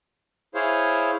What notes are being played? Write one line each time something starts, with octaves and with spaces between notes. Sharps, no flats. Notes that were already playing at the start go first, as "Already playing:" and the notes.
E4 G#4 C5 C#5 F5